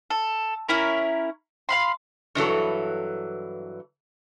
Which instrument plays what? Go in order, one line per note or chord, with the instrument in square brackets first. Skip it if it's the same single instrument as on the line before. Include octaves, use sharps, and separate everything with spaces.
[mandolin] A4
C#4 E4 A#4
F5 B5 C6
[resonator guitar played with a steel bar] G2 E3 F#3 A4